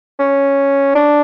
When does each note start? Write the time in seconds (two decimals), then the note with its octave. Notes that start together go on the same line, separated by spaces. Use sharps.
0.19 C#4
0.95 D4